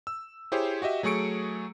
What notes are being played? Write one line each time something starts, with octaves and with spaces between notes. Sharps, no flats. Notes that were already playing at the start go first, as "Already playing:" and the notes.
E6
E4 G4 G#4 C5 C#5
F#4 G4 D#5 E5
F#3 A3 G#4 C#6 C#7 D7